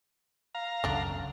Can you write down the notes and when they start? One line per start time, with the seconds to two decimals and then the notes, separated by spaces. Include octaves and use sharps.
0.55 F5 A#5
0.84 F#1 C#2 D3 C#4 D4